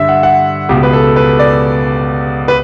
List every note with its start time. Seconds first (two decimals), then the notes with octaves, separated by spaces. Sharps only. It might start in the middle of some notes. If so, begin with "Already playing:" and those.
Already playing: G2 D3 E5
0.09 F#5
0.23 F#5
0.69 C#2 B2 G4
0.83 B4
0.93 A4
1.16 B4
1.39 D5
2.48 B4